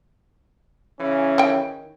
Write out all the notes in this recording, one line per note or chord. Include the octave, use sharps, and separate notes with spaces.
C#3 E3 C#4
D#3 G5